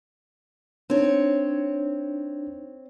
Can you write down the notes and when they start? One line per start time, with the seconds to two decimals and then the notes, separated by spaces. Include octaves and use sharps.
0.90 C4 D4 D#4 C#5